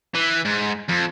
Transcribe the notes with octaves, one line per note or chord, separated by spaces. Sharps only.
E3
G#2
F2